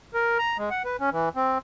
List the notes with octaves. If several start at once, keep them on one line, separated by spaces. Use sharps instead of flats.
A#4
A#5
G#3
F#5
B4
C#4
E3
C4